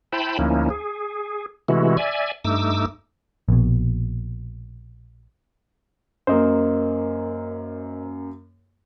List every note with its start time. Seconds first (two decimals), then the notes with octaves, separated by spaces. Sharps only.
0.13 E4 C5 G5 A5 B5
0.39 D2 F3 A#3 C#4 D#4 E4
0.70 G#4
1.68 C3 E3 G#3 A3 E4 F#4
1.97 D5 E5 G#5
2.44 G2 A3 D#4 D6 E6
3.48 A#1 B2
6.27 F#2 A#3 C5 D#5